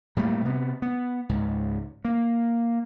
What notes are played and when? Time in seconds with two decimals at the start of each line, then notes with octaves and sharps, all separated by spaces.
0.17 A2 G3 A3 A#3
0.45 C3 B3
0.82 B3
1.29 C#2 G#2
2.05 A#3